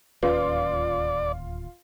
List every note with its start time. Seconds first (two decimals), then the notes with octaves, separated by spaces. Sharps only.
0.23 D1 D#2 C#4 F4 B4 D5